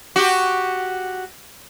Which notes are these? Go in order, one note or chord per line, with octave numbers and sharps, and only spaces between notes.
F#4 G4